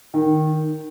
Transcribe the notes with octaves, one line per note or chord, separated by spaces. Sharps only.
D#3